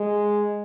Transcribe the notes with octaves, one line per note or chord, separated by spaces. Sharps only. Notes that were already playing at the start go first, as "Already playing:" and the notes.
Already playing: G#3